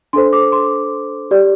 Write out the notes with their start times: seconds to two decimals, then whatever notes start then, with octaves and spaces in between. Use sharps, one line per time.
0.13 D4 A4 C5 C6
0.33 D6
0.52 C6
1.31 G4 D5